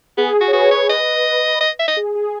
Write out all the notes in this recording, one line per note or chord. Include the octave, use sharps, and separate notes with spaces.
B3 G#4
F#4
C#5
F#4 B4
C#5
D#5
D#5
E5
D#5
G#4
G#4